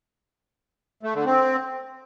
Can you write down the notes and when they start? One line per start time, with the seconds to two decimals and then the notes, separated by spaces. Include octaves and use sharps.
1.03 A3
1.14 D3
1.25 C4